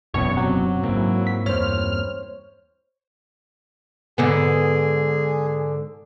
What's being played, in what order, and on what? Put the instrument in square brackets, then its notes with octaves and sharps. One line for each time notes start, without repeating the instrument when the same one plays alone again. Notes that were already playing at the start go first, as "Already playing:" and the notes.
[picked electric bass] E1 B2 B3 [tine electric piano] A1 F#2 [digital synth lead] C#5
[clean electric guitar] C3 G4 [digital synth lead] F#3
[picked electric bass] G#2 [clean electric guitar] A#3 C4 E4
[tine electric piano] B6
[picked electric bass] E2 G2 [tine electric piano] C5 C#5 [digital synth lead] F6
[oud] G#2 D3 B3 [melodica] G#4